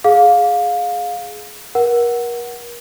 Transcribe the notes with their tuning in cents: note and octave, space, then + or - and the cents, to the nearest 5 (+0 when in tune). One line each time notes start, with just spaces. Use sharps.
G#4 +15 F5 +20
A#4 +35 F#5 +0